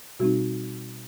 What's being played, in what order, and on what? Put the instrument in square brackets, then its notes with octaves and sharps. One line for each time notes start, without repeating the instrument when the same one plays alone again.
[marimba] B2 G3 C4 D#4 F#4